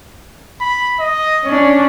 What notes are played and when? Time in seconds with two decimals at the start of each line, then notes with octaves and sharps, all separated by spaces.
0.61 B5
1.00 D#5
1.46 C#4 D4 C#5